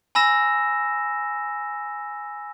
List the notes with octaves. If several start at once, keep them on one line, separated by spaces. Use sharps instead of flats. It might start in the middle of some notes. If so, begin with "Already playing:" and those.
G#5 B5 E6 A#6 E7